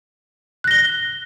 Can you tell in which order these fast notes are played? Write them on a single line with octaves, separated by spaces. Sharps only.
F#6 A#6 G7